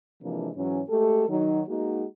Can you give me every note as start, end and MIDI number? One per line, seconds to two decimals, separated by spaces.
0.22 0.49 48
0.22 0.49 52
0.22 0.49 53
0.22 0.49 56
0.22 0.49 58
0.22 0.49 62
0.56 0.82 44
0.56 0.82 52
0.56 0.82 54
0.56 0.82 61
0.88 1.27 56
0.88 1.27 57
0.88 1.27 67
0.88 1.27 69
1.29 1.62 51
1.29 1.62 54
1.29 1.62 63
1.67 2.05 56
1.67 2.05 58
1.67 2.05 63
1.67 2.05 66